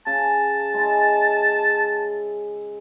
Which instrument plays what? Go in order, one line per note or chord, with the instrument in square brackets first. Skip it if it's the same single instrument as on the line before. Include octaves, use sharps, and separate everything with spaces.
[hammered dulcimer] C#3 [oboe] A5
[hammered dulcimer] G#3 E4